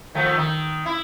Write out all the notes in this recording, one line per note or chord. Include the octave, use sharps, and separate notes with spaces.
D#3 F3 A3
D#3
E4